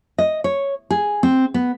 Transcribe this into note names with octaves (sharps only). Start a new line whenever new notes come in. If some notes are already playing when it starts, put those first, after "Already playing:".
D#5
C#5
G#4
C4
B3